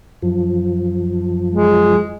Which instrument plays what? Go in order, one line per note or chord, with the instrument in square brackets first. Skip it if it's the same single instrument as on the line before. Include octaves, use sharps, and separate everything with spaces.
[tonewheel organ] F#2 F3
[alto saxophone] G#3